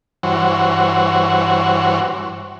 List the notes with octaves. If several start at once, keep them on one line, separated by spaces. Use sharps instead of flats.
G2 E3 F#4 C5 C#5